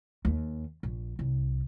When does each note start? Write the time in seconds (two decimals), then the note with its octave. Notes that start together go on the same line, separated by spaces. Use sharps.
0.25 D#2
0.83 A#1
1.19 C2